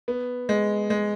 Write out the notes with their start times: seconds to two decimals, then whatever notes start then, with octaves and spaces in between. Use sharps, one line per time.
0.08 B3
0.49 G#3
0.90 G#3